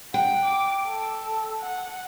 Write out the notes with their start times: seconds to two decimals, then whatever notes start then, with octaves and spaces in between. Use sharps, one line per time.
0.14 F#5 G5
0.44 D6
0.87 A4
1.60 F#5